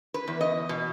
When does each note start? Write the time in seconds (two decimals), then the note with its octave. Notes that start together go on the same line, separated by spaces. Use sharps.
0.14 B4
0.28 E2
0.41 D#5
0.69 B2